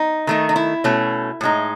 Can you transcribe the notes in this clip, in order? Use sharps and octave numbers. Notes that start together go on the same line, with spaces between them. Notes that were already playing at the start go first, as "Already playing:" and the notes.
Already playing: D#4
D#3 A3 D#4
D#4
E4
B2 A3 C#4
A2 G#3 D#4